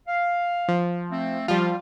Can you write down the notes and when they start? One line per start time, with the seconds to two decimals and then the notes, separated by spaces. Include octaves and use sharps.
0.07 F5
0.68 F3
1.11 A3 C4
1.48 F3 G3 F4